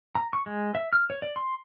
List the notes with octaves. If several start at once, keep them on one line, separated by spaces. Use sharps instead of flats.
A#5
C#6
G#3
E5
F6
C#5
D5
C6